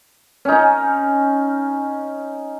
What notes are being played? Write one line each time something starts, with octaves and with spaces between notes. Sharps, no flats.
C#4 D#4